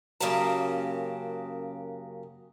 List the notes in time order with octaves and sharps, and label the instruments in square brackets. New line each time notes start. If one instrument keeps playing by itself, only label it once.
[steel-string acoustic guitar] F#2 C#3 F#3 A#3 G4 A5